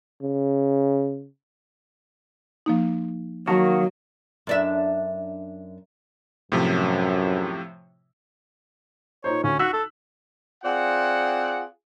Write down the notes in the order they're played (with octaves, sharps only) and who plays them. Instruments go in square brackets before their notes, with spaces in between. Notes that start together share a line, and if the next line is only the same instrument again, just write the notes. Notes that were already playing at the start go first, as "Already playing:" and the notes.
[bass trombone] C#3
[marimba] F3 A#3 D#4
[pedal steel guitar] D#3 A#3 F#4 [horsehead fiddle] F#3 [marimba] A5 A#5
[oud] F#2 D4 E5
[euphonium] F#2 [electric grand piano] A2 C3 F3
[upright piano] A#2 D#4 C5 [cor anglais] C#5
[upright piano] D2 [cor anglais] C#4
[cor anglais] F#4 [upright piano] E6 F#6 B6
[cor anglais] A4
[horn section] C4 F4 G#4 D5 F#5